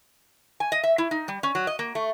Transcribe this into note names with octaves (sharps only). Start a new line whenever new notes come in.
G#5
D#5
E5
E4
D#4
G3
C#4
F#3
D#5
A#3
A3